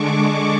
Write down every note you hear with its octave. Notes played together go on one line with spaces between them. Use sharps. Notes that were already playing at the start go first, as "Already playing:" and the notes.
Already playing: D3 G#3 D4 C#6 D6